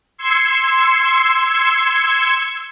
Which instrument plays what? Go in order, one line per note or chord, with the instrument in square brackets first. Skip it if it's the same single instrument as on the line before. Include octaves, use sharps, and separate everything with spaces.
[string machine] C6 E6 G#6 C7 C#7